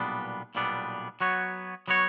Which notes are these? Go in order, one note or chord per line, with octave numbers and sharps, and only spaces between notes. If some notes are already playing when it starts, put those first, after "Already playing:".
Already playing: B1 A#2 G3 B3 D4
B1 A#2 G3 B3 D4
F#3 B3 F#4 C#5
F#3 B3 F#4 C#5